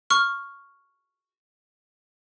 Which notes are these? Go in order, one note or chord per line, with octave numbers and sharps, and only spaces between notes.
C#6 F6